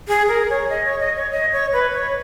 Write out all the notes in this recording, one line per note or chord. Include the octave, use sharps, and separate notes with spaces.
G#4
A#4
C#5
D#5
C#5
D#5
C#5
D#5
C#5
B4
C#5